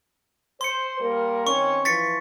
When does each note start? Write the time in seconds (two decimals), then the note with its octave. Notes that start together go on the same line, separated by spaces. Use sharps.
0.61 C5 C6 C#7
1.00 G3 A#3 A#4
1.47 D#3 C4 C#4 C#6
1.85 E3 F3 A6 B6 C#7